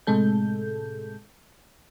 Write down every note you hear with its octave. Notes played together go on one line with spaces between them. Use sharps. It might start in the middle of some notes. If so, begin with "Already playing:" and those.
A2 C3 G#3 A4 G6